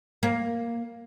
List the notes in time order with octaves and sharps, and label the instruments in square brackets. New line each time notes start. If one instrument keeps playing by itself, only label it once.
[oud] A#3